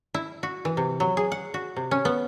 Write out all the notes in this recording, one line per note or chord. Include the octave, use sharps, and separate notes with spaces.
E4
F#4
E3
C3
F#3
G#4
F#5
F#4
C3
C#4
B3